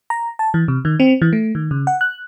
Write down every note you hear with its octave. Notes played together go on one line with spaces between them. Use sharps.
A#5
A5
E3
C3
D#3
C4
E3
A3
D#3
C#3
F#5
F#6